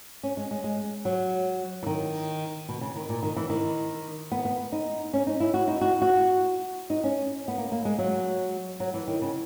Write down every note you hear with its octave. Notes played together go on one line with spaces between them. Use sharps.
C#4
G#3
G#3
G#3
F#3
E3
D#3
B2
C#3
D#3
A#2
D#3
E3
D#3
B3
B3
D#4
C#4
D#4
E4
F#4
D#4
F#4
F#4
D#4
C#4
B3
A#3
A#3
G#3
F#3
F#3
E3
D#3
C#3